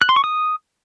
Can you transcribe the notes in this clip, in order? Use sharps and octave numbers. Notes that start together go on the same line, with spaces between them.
F#6
C6
C#6
D#6